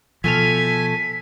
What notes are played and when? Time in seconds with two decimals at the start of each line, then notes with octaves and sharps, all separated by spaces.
0.24 B2 F3 A3 A4 G#5 F6 B6